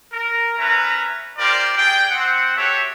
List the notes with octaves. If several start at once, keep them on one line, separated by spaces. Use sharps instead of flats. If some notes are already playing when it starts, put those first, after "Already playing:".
A#4
C#4 B4 E5 A#5
F4 G4 A#4 C5 D5
G#4 D5 G5
C4 F#5
F#4 G4 A4 C#5 E5